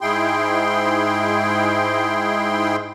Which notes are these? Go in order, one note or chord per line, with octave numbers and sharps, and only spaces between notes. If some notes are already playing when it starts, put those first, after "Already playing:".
G#2 G#3 E4 G#4 G5 C6